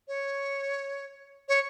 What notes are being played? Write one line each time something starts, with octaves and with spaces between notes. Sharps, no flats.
C#5
C#5